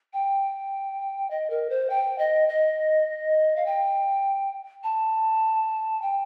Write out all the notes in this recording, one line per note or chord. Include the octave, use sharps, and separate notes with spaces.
G5
D#5
A#4
C5
G5
D#5
D#5
F5
G5
A5
G5